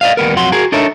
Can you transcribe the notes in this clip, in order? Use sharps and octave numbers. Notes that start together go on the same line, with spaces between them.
D5 D#5 F5
D#2 G3 B3 A#4
F2 F#3 F#5 C6
F#4 G#4 A#4
D4 D#4 A4 A#4 C#5 E5